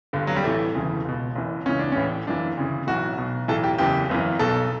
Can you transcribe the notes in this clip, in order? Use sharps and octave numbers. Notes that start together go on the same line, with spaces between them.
G1 G2 D3
F#3
G3
A1 A2 E3 A3
E1 D2 C#3 E3
C#2 B2
F#1 F#2 E3
C#2 C#3 E3 C#4
D4
A1 A2 E3 C#4
G1 F#2 E3 D4
D2 C#3 E3
B1 A2 E3 F#4
B1 B2
B1 A2 E3 A4
G4
F#1 E2 C#3 E3 G4
G1 F#2 E3
B1 B2 A4